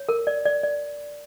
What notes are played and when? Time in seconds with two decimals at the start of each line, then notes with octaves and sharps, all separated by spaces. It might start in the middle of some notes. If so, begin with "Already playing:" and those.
Already playing: C#5
0.09 A#4
0.27 D5
0.46 D5
0.63 D5